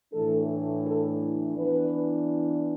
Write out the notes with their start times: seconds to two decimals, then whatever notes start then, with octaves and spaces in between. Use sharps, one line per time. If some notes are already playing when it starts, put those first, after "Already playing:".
0.13 A2 E3 A3 D4 A4
0.86 A4
1.58 E3 B3 D4 B4